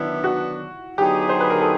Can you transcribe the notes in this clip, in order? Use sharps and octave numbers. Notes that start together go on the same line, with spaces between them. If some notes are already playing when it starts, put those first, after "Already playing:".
Already playing: D#3 F#3 B3 D4 E4
F#4
D3 F#3 B3 D#4 G4 G#4
C5
B4
A#4
A4